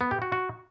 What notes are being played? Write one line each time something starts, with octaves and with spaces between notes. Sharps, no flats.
B3
G4
F#4
F#4